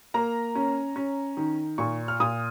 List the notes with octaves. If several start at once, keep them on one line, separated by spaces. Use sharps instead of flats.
A#3 A#5
C#4
C#4
D#3
A#2 C#6
F6
A#2 D#6